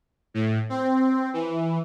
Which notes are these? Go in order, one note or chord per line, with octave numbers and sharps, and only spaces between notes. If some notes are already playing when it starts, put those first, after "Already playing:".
A2
C4
E3